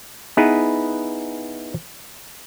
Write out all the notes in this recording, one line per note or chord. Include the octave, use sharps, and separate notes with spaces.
B3 D#4 E4 G#4 B4